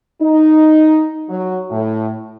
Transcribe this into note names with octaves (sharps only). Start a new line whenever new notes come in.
D#4
F#3
A2